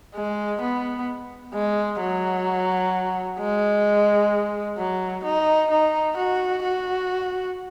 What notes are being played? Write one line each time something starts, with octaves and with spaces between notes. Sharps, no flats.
G#3
B3
G#3
F#3
G#3
F#3
D#4
D#4
F#4
F#4